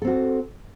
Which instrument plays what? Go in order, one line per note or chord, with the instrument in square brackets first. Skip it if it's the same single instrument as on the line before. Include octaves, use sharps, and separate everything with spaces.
[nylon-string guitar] A4
C4
F#4